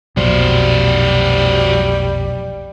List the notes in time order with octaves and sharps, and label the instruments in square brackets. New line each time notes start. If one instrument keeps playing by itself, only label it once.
[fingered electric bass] F1 B1 A#2 [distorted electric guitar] F#3 C5 [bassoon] G3